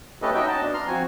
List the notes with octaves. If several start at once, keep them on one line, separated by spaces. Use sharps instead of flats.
A3 C#4 G4 A4 B4 D#5
C#4 D#4 F#4 D#5 E5 G5
C#4 F#4 D#5 A5
B3 D4
A#5 C6 F6
F3 C4 F#4 G#5